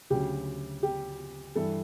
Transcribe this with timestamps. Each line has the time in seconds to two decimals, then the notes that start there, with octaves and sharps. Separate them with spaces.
0.10 D2 C#3 F#3 G4
0.83 G4
1.55 G2 E3 G3 A4